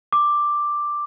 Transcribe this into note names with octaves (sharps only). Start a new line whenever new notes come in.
D6